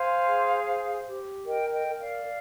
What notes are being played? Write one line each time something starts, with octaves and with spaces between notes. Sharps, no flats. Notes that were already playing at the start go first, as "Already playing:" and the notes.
Already playing: C5 F5 G#5
G#4
C5
G4
A#4 D#5 G5
D#5 G5
A#4
D5 F5